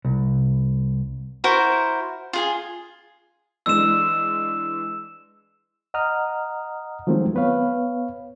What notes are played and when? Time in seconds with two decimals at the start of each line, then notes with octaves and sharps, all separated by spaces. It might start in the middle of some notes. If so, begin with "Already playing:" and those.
0.05 C2
1.44 E4 F#4 A#4 C5
2.33 F4 G#4 G#5
3.66 E3 G#3 D4 E6 E7
5.94 D#5 F#5 A#5 D#6 F6
7.07 D#3 F3 F#3 G#3 A3 C4
7.35 B3 B4 C#5 F5